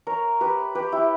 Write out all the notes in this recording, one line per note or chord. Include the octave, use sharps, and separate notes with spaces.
A#4 C#5
G4 B4
G4 B4
E4 G4